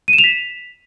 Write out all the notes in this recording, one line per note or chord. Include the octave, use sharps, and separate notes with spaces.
D#7
E7
F7
B6